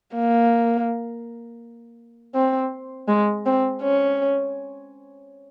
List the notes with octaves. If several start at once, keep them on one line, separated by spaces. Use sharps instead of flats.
A#3
C4
G#3
C4
C#4